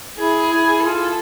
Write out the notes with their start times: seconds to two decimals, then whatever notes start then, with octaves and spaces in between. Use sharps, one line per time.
0.18 E4 G#4
0.53 E4
0.86 F4 A4